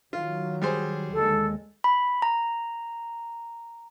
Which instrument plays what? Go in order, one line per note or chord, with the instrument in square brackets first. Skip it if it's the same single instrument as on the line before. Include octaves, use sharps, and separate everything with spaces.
[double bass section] D#3 F#3 [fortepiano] F4
[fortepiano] G3 G#4 C5
[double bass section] D#2 D3 G#3 [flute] A4
[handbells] B5
A#5